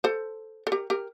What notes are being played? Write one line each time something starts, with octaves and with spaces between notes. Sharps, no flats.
A4 C5
A4
G4 A#4
G4 A#4